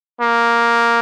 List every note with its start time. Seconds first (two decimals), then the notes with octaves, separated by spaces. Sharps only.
0.21 A#3